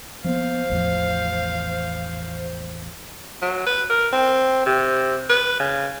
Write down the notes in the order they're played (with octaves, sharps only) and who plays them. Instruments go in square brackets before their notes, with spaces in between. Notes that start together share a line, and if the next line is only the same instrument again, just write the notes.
[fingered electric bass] F3 A#3 B3 [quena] C5 [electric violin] F5
[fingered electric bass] A1 E2 F3
[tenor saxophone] F#3
B4
A#4
C4
C3
B4
C#3